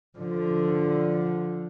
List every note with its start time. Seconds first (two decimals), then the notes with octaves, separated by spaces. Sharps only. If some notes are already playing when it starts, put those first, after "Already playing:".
0.18 D3 F3